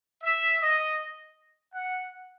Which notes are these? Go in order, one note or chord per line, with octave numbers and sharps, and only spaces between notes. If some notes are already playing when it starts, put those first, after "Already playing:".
E5
D#5
F#5